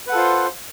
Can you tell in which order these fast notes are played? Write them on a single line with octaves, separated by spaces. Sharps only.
B4 F#5 A4 F4 C5